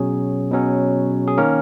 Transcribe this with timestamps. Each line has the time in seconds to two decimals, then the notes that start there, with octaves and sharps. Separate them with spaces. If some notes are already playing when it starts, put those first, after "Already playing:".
Already playing: B2 F#3 C#4 G#4
0.51 B2 F#3 C#4
1.28 G#4
1.38 D#3 A#3 C#4 A#4